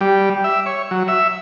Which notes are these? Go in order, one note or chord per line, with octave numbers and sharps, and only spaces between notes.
G3
E5
C#5
F#3
E5